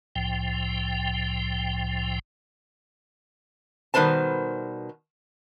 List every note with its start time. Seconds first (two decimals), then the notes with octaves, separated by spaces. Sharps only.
0.16 C2 A2 F3 G5
3.94 B2 D#3 G3 B4 C5 A5